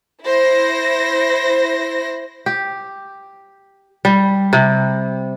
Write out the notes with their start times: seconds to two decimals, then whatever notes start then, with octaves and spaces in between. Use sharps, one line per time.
0.24 E4 C5 A#6
2.46 G4
4.05 G3
4.53 C3